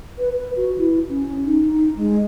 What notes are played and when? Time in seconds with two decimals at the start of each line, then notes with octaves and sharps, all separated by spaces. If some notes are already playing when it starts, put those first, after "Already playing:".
0.18 B4
0.33 B4
0.56 F#4
0.78 E4
1.09 C#4
1.45 D#4
1.72 D#4
1.97 G#3